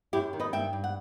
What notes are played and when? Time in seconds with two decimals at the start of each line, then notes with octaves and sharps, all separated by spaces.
0.13 F#2 E4 G4
0.33 D#3
0.40 B4 D#5
0.53 G2 E5 G5
0.73 G2
0.84 F#5